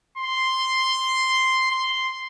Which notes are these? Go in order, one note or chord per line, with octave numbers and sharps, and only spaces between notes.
C6
C6